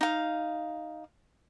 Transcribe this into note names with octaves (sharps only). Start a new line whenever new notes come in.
D#4 F5